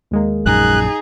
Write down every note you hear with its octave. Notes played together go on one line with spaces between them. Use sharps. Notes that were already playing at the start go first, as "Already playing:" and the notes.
D#2 G#3 A#3
A#1 F#2 A#2 D#4 G#4 F#6